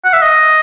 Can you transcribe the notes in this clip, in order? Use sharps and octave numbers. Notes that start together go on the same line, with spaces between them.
F#5
E5
D#5